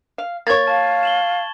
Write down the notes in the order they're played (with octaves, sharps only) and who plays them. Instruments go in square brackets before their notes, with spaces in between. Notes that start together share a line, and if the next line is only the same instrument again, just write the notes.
[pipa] F5
[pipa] A#3 C#5 [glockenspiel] C#6 G#6 A6
[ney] F5 [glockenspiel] A5
[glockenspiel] E7 F#7 G7